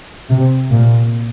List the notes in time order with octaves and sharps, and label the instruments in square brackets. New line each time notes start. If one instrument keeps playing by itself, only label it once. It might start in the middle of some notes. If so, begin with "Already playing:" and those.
[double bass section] C3
A#2